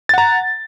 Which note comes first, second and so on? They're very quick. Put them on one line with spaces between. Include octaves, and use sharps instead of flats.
A6 F#5 A#5